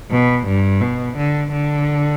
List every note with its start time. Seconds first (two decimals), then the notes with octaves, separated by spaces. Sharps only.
0.11 B2
0.47 G2
0.82 B2
1.17 D3
1.52 D3